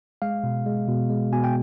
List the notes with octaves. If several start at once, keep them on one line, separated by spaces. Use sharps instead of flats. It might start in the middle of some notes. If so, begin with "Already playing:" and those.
G#3 F5
B2
G#3
B2
G#3
B2 G#5
G5